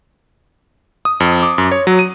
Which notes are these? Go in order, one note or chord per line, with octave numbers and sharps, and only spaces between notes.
D#6
F2
D6
F#2
C#5
F#3
D#7